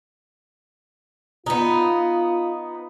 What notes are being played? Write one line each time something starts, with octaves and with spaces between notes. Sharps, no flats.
B3 D#4 F4